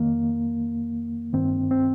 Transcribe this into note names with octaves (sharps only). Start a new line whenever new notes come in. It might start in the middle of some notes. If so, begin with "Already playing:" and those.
Already playing: F2 D#3 A#3
G2 D#3 C4
C4